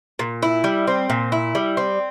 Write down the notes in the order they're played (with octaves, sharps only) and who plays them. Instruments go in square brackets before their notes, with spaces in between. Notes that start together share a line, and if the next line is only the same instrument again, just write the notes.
[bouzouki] A#2
E4
G3
C4
A#2
E4
G3
C4